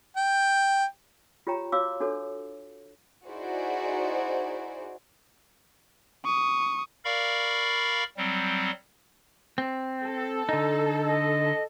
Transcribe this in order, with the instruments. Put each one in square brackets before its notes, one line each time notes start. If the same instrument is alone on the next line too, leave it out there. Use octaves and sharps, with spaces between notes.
[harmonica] G5
[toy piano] F4 G4 C#5 G5 A#5
F#4 C#5 F5 D6 E6
D4 F#4 A4 C#5
[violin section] D#4 E4 F#4 G#4 C5 D5
[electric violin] C#6 D#6
[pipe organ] A#4 D5 F5 B5 C#6
F#3 G3 C4
[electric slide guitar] C4
[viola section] A4
[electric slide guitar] D3 D#4
[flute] D#5